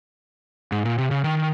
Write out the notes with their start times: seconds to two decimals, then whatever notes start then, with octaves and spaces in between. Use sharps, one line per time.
0.72 G#2
0.85 A#2
0.98 C3
1.11 C#3
1.24 D#3